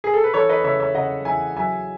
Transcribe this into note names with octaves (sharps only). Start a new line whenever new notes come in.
G#4
A4
B4
E3 A4 C#5
B4 D#5
C#3 C#5 E5
C#5 E5
C#3 D#5 F#5
E3 E5 G#5
F#3 E5 G#5